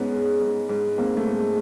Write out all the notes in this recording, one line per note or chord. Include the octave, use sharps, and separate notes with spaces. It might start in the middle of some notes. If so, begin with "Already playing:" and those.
Already playing: G#2 B3 C#4
G#3
G#2
G#2
G#2 A#3 C4
A3
G#2
G#3